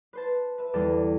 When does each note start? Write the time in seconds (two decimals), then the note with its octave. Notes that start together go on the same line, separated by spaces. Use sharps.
0.13 B4 C5 A5
0.58 B4 E5
0.73 E2 D3 G3 A4 D5 G5